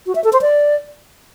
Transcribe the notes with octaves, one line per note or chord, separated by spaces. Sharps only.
F#4
E5
A4
C5
D5